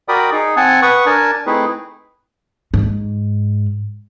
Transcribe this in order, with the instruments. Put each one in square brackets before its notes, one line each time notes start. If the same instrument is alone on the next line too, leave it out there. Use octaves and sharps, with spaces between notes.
[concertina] F#4 A#4 D5 G5 B5 D#6
D#4 G#4
C4 F#5 G#5 A5
B4 F#5 C#6 D#6
D4 A#4 G#5 A5
A3 C4 D#4 E4 G#4 B4
[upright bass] G#2